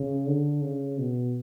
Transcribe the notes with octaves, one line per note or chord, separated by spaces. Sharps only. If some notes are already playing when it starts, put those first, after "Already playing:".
Already playing: C#3
D3
C#3
B2